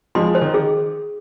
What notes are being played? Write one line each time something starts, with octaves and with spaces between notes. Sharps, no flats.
F3 G#3 C6
C5
D#3
G#4